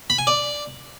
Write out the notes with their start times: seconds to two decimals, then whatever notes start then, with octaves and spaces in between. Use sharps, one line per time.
0.10 B5
0.18 G#5
0.27 D5